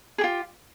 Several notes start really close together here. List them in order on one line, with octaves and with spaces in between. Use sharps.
G#4 G4 F4